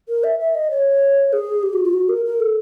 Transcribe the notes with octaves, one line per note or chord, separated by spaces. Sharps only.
A#4
E5
E5
D#5
C#5
G#4
G4
F#4
F4
F#4
A#4
A#4
A4